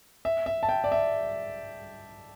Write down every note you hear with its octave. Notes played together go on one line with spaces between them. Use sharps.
E5
E5
A5
G5
D5
E5